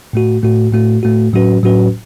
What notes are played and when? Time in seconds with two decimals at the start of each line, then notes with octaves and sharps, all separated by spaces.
0.13 A2 A3 F#4
0.43 A2 A3 F#4
0.73 A2 A3 F#4
1.03 A2 A3 F#4
1.33 A2 F#3 C#4 F#4 B4
1.63 A2 F#3 C#4 F#4 B4